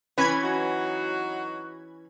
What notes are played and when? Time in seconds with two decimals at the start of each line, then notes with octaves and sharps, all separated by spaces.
0.18 E3 C#4 B4 B5 G#6
0.43 F#3 D#4 F#4